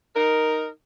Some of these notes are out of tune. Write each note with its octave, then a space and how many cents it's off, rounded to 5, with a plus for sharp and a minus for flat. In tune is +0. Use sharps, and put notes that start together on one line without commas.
D#4 +0 A#4 +0